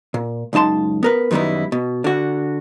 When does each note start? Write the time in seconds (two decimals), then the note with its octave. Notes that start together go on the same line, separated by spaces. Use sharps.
0.14 A#2
0.53 C#2 F#2 D#4 A5 C6
1.03 B3 A#4 B4
1.31 F#2 D#3 G3 B3 D#4 E4
1.72 B2
2.04 D3 F#4